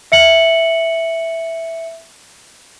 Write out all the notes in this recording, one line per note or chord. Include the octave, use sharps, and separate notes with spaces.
E5 C#7 F#7